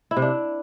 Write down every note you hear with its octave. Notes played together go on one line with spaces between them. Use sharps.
E4
C3
D4